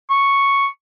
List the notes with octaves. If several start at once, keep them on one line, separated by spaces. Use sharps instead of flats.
C#6